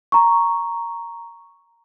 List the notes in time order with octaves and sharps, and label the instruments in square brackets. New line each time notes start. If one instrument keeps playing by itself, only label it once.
[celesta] A#5 C#6